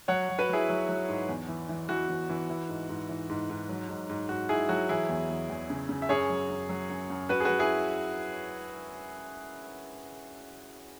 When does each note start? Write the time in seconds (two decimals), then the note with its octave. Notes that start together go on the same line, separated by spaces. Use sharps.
0.08 F#3 C#5 F#5
0.29 F#3
0.38 F#4 B4
0.49 F#3 E4 G#4
0.69 F#3
0.89 F#3
1.09 G#2
1.29 E2
1.48 E3
1.69 E3
1.89 E3 F#4
2.09 E3
2.30 E3
2.50 E3
2.69 G#2
2.89 G#2
3.09 E3
3.29 G#2
3.50 G#2
3.69 F#3
3.89 G#2
4.09 G#2
4.29 G#2 F#4
4.49 G#2 E4 G#4
4.69 F#3 F#4
4.89 E3 E4 G#4
5.09 E2
5.30 E2
5.49 E2
5.70 C#3
5.89 C#3
6.02 E5
6.09 F#2 G#4 C#5
6.30 F#3
6.49 F#2
6.69 F#3
6.89 F#2
7.10 F#2
7.29 F#2 F#4 B4
7.40 G#4
7.45 F#3 F#4 B4
7.59 E4 G#4